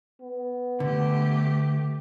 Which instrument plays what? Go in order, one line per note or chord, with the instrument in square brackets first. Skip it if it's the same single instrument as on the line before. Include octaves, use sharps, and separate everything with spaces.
[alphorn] B3
[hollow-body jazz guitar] D3 [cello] A3 G4